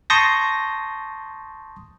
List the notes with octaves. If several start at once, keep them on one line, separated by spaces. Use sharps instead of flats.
A5 C6 C#6 D#6 G6 A#6